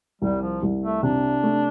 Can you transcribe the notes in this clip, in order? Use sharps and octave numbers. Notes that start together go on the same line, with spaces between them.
C2 G3
F3
C2
A3
C3 D4
A3